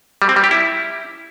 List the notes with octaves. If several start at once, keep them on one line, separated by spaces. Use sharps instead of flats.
G3
C4
G3
G4
E4